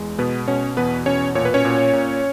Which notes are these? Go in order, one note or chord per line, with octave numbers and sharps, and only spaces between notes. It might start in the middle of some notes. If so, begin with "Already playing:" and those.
Already playing: E2 G#3
B2 B3 B4
B2 C#4 C#5
E2 B3 B4
B2 C#4 C#5
A#2 C#5
B4
C#4 C#5
A#2
A#2